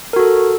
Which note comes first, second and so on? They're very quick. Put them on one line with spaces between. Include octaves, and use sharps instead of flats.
A#4 F#4 A4